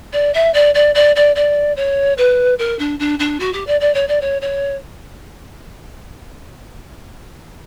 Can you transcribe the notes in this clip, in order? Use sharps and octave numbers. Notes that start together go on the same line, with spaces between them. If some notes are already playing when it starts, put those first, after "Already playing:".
D5
E5
D5
D5
D5
D5
D5
C#5
B4
A#4
D4
D4
D4
F#4
G4
D5
D5
C#5
D5
C#5
C#5